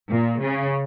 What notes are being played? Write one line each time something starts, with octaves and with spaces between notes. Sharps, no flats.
A#2
C#3